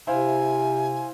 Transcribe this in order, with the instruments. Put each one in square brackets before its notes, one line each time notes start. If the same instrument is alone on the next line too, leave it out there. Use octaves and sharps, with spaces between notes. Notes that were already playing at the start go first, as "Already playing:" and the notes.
[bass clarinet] C3 [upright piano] E4 C5 F5 [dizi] G#5